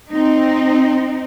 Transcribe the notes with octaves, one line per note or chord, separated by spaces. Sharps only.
C4 D#4